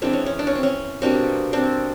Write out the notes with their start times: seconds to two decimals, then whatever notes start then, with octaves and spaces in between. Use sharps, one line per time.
0.02 E3 G#3 B3 C4 D4
0.13 C#4
0.26 C#4
0.39 D4
0.47 C#4
0.55 C4
0.63 C#4
1.02 B2 G3 A#3 C4 D4
1.53 C4 D4